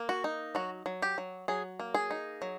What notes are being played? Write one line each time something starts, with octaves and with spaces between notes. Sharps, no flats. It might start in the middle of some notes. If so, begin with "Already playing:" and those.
Already playing: A#3
F#4
D#4
F#3 F#4
F#3
G4
F#3
F#3 G#4
A#3
G#4
D#4
F#3